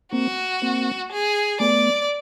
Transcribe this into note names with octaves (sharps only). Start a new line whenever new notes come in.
A#3 C4 F#4
A#3 C4
G#4
A3 B3 D5